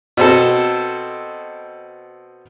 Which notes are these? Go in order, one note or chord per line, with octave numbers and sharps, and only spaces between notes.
B2 C4 A4